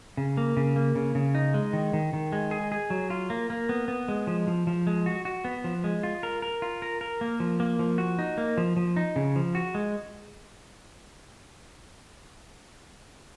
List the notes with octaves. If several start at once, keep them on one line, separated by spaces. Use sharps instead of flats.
C#3
A#3
C#3
A#3
C#3
C#3
D#4
G#3
D#3
D#3
D#3
G#3
G#4
G#4
F#3
F4
A#3
A#3
B3
B3
G#3
F3
F3
F3
G#3
F#4
F#4
B3
F3
G#3
F4
A#4
A#4
F4
A#4
A#4
A#3
F3
A#3
F3
F#4
D#4
A#3
F3
F3
D#4
C#3
F3
F#4
G#3